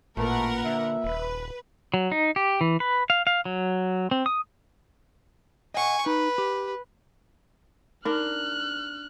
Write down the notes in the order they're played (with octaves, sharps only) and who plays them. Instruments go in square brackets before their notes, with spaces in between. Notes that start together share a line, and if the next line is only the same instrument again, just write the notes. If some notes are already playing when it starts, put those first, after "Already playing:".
[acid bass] A1 [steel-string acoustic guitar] A#2 A#3 [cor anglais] A3 [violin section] A#4 B4 F#5
[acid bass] D3 [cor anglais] E5
[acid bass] D#1 [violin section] B4
[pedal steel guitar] F#3
D#4
G4
E3
B4
F5
F5
F#3
C4
D#6
[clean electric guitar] D#5 F#5 [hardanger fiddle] G#5 C#6
[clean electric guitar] D#4 [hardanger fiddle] B4
[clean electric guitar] G4
[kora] D4 A#4 [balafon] D#4 [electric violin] F6 F#6